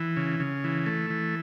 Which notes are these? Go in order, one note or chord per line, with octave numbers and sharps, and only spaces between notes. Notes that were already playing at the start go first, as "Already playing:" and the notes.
Already playing: E3
C#3
C#3
E3
A3
E3